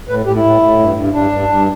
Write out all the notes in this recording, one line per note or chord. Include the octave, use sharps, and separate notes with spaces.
A2 B4
A2 G4
E4
A2
A2
G2
G2
G2 D4
G2
G2